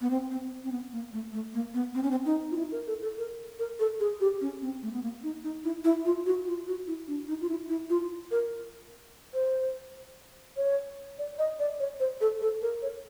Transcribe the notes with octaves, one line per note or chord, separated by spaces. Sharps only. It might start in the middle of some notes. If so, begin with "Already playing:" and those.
B3
C4
C4
C4
B3
A#3
A3
A3
A#3
B3
C4
C#4
C4
D#4
F4
E4
A#4
A4
A4
A#4
A#4
A4
G#4
G4
C#4
C4
A3
B3
A#3
D#4
D#4
E4
E4
F4
F#4
F4
F#4
E4
D4
D#4
F4
E4
E4
F4
A#4
C5
C#5
D5
D#5
D5
C#5
C5
A4
A4
A#4
C#5